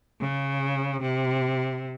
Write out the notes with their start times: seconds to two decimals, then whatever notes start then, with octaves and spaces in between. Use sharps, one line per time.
0.19 C#3
1.00 C3